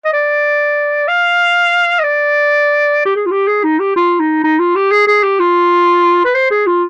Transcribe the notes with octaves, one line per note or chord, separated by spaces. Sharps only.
D#5
D5
F5
D#5
D5
G4
G#4
F4
G4
G#4
D#4
G4
F4
D#4
D#4
F4
G4
G#4
G#4
G4
F4
B4
C5
G#4
F4